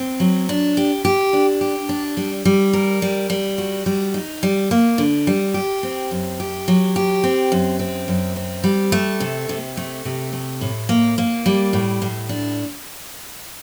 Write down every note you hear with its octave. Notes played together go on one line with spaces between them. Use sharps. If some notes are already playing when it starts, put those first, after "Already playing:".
Already playing: C4
F#3
D4
G4
G4
D4
G4
D4
G3
G3
A#4
G3
G3
F#4
G3
D#4
G3
A#3
D3
G3
G4
C4
F#2
G4
F#3
G4
C4
F#2
C4
F#2
C4
G3
A3
C3
C3
A3
C3
A3
A2
A#3
A#3
G3
A2
A2
D4